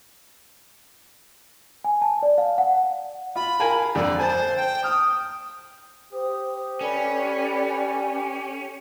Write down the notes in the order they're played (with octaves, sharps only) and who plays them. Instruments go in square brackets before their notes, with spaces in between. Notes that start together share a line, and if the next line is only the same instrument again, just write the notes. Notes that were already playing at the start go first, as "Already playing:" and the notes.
[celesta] G#5
A5
D5
F5
F#5
[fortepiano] F4 [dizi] B5
[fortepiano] A#4 F5 G#5
[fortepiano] F2 D3 [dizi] D5
[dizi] C5 [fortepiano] G#5 A5
[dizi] G5
[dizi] D#6 [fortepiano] F6
[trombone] G4 [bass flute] C5 [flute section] D#6
[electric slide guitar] C#4 [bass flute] A4 [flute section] B4 D5